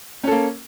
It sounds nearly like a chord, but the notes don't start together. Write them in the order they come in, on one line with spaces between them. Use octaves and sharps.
C#4 A4 A#3